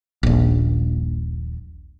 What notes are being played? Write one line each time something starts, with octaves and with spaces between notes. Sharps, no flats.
D#1 A#1